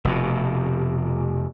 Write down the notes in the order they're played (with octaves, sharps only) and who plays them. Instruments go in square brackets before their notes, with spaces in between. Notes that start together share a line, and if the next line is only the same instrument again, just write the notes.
[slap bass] F1 F2 B2